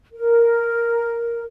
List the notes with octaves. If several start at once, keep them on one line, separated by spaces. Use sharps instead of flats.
A#4